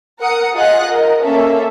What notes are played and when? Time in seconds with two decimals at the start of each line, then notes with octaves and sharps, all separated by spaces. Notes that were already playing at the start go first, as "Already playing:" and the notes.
0.20 A#4 F#5 D#6 C#7
0.55 F4 G#4 D#5 F#5 D#6 F#6
0.85 A#4 D#5
1.23 A#3 C#4 A4 E5